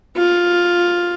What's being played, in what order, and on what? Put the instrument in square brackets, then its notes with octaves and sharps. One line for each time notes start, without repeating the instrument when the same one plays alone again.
[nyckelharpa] F4